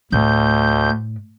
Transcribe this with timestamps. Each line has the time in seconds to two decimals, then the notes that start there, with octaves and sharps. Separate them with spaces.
0.12 D2 A2 G6